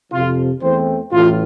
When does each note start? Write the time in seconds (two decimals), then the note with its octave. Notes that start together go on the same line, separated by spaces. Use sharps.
0.11 F2 C3 F3 F4
0.61 E2 E3 A3 C4 C5
1.11 A1 A2 E3 F4